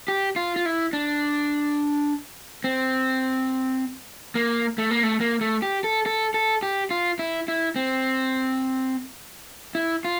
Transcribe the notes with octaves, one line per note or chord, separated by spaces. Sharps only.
G4
F4
F4
E4
D4
C4
A#3
A3
A#3
A3
A#3
A3
G4
A4
A4
A4
G4
F4
E4
E4
C4
E4
F4